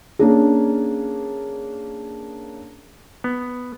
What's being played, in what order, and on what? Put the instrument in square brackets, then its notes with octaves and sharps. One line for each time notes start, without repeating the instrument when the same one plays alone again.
[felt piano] A#3 C#4 D4 G#4
[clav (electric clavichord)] B3